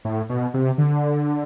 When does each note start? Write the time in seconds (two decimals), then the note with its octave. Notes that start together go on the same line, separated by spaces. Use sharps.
0.05 A2
0.29 B2
0.54 C3
0.78 D3